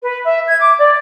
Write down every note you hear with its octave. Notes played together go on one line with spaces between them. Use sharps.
B4
E5
G#6
D6
D5